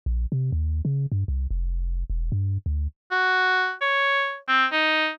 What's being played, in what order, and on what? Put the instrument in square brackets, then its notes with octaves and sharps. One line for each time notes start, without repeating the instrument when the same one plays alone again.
[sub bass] A#1
C3
D#2
C#3
G2
C2
F1
E1
G2
D2
[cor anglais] F#4
C#5
C4
D#4